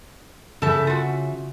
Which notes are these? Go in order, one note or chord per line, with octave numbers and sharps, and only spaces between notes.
C#3 A4 E5 A5
F4 F#4